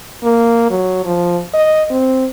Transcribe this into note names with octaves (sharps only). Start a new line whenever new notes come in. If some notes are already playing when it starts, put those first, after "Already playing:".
A#3
F#3
F3
D#5
C4